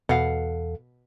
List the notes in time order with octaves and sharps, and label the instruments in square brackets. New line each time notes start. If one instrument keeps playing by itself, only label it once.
[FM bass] E2 [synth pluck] B2 [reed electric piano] A4 [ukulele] F5 F#5